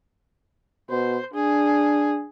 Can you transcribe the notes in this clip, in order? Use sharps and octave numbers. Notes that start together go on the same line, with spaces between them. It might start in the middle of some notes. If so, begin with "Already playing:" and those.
B2 C5
D4 G#4